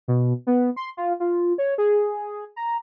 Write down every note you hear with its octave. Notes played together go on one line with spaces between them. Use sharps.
B2
B3
C6
F4
F4
C#5
G#4
A#5